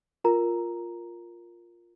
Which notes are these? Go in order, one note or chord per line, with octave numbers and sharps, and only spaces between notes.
F4 A#4 A#5